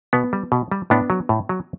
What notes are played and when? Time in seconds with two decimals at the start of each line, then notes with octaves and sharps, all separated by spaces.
0.13 B2 B3
0.33 G3
0.52 B2
0.71 G3
0.90 A2 B3 D4
1.10 F#3
1.29 A2
1.49 F#3